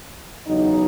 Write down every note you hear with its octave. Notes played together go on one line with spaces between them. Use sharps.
E2 C#3 F#3 D#4